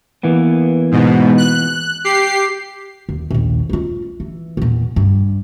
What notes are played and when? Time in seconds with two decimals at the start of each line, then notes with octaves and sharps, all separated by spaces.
0.23 E3 A#3 B3
0.91 G#2 B2
1.38 F#6
2.04 G4 C7
3.09 D#2
3.31 A#1 D#2
3.70 D#4 F4
4.20 E3
4.57 E2 A#2
4.96 G2